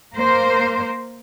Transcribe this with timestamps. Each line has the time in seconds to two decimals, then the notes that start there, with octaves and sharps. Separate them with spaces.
0.15 A#3 A#4 C5